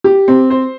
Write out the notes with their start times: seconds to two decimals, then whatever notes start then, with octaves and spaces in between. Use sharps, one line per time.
0.04 G4
0.28 C4
0.50 C5